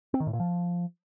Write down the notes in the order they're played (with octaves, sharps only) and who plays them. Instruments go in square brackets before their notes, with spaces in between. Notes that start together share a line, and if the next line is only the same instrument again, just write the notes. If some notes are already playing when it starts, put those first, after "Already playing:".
[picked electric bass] C4
D#3
A2
A#2
F3